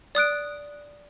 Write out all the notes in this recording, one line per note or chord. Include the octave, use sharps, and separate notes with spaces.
D5 D#6 F#6 D7